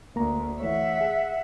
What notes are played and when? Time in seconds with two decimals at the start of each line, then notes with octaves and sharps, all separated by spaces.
0.16 D2 A#3 A#5
0.60 E3 A3 C#5 E5 F#5
1.01 G#4